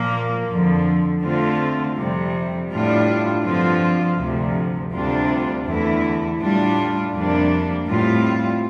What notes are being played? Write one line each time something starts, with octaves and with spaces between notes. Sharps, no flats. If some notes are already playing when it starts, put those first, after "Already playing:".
Already playing: A#2 F3 A#3
F2 D3 F3
D3 A3 C4 F4
F2 C3 G3
A2 G3 D4 F4
G2 D3 F3 C4 F4
D2 C3 F3
D2 C3 G3 D4 F4
E2 D3 A3 E4
A2 G3 D4 F4
F2 C3 G3 A#3 D4
A2 G3 C4 F4